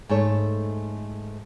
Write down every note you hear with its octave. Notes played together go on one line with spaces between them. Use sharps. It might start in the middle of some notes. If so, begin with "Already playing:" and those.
G#2 A3 C#5 A5